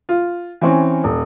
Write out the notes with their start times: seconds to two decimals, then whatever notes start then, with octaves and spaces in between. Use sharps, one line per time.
0.09 F4
0.61 E3 C4 C#4
1.04 D#1